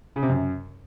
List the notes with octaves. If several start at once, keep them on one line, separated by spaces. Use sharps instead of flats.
C#3
C3
F#2